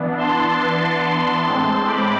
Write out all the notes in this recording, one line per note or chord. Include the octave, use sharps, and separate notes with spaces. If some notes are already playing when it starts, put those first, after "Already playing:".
Already playing: E3 B3 D4
A5 C6
A5 C6
A2 G#3 C4
B5 D6